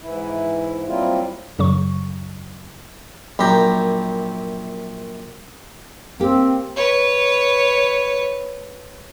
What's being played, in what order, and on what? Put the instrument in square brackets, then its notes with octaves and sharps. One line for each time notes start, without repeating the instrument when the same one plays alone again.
[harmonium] G#2 E3 E4
F#3 G3 A#3 C4 E4 F4
[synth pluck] F#2 C#3 F#3 C#6
[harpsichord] A#1 F#2 G4 A#5
[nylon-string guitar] A#3 G4 [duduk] C4
[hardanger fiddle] B4 C#5